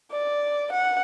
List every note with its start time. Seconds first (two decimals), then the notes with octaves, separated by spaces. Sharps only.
0.12 D5
0.72 F#5